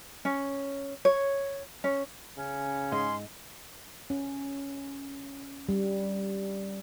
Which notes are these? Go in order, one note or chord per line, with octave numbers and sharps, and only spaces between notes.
C#4
C#5
C#4
C#3 C#4
G#2 G#3 D#5 C6
C#4
G3